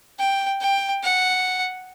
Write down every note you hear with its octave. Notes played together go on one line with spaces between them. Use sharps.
G5
G5
F#5